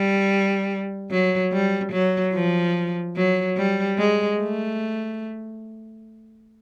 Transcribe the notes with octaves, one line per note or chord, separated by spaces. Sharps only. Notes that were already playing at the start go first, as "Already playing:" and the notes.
Already playing: G3
F#3
G3
F#3
F3
F#3
G3
G#3
A3